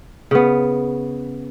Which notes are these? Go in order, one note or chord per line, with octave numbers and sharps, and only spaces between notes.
C#3 B3